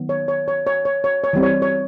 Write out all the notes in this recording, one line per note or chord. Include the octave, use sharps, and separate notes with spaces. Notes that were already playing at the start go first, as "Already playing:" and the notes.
Already playing: D#3 F#3 B3
C#5
C#5
C#5
C#5
C#5
C#5
C#5
E3 G3 C4
C#5
C#5